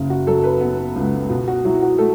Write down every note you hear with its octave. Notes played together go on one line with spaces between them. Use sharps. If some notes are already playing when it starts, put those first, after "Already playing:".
Already playing: F#1 C#3
F#4
F#3 A4
B4
B3
C#2
B2
F#4
F#3 E4
F#4
A3 A4